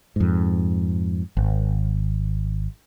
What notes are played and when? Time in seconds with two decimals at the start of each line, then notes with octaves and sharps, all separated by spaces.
0.16 F2 G#2
1.37 G#1